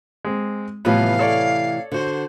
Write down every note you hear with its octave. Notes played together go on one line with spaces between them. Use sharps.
G#3 C4
A2 C3 E3 F3 G3 B3 F5
A4 C#5 D5
D3 F#4 C5